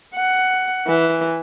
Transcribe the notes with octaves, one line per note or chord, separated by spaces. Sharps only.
F#5
E3